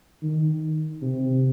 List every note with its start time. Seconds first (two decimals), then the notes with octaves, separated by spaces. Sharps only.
0.22 D#3
1.02 C3